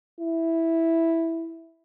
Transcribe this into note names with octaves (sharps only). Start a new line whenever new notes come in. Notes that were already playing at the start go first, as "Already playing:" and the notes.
E4